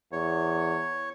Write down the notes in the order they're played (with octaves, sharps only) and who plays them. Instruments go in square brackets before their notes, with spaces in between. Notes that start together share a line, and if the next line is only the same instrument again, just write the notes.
[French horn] E2 [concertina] C#5